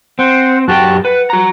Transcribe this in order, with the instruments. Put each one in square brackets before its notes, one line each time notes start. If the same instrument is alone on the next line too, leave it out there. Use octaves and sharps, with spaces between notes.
[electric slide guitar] C4 [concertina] C5 F#5
[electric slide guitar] F#2 G4 G5 [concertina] F#4 A5 F#6
[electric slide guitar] B4 [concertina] F#5
[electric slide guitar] F#4 A#5